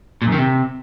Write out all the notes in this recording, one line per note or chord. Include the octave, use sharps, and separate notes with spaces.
A#2
F#2
D#3
C3